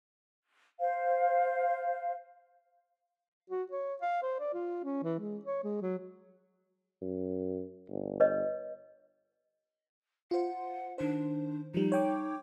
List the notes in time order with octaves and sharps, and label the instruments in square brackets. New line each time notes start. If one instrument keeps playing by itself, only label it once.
[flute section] C5 F5
[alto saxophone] F#4
C#5
F5
C5
D5
F4
C#4
E3
G#3
C#5
G#3
F#3
[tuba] F#2
G1
[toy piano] B4 C#5 D#5
[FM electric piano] F4 C5 [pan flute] F#5
[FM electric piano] D#3 C5 [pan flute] D4
[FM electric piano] F3 G3 [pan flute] D#4
[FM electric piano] C#5 G5 D6